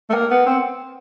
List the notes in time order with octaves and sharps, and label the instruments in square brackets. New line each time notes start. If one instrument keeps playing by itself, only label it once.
[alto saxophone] A3
A#3
B3
C4